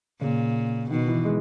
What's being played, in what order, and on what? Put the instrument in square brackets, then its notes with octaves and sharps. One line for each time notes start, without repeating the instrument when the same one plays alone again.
[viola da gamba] A#2 [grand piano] C#3
[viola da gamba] B2 [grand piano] D#3
[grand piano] E3
G#3